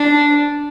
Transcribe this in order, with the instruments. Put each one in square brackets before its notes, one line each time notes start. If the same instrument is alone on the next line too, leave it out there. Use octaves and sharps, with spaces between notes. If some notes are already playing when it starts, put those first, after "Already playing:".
Already playing: [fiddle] D4